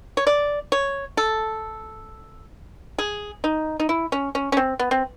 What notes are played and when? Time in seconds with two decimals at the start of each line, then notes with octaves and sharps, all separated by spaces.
0.17 C#5
0.27 D5
0.72 C#5
1.17 A4
2.98 G#4
3.44 D#4
3.80 D#4
3.89 E4
4.12 C#4
4.35 C#4
4.52 C#4
4.57 C4
4.79 B3
4.91 C4